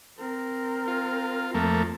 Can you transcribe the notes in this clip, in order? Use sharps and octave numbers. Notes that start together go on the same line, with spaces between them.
C4 A#4
F4
F2 A3 A#3